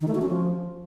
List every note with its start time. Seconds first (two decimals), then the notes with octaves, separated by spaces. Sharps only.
0.01 D#3
0.08 A3
0.15 F#4
0.22 C#4
0.29 F3